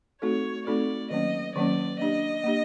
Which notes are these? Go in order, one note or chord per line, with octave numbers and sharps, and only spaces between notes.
A3 C4 D#4 F#4 A4 C#5
A3 C4 D#4 F#4 A4 D5
D#3 F#3 A#3 C#4 D#5
D#3 F#3 A#3 C#4 D5
A#3 D4 G4 D#5
A#3 D4 G4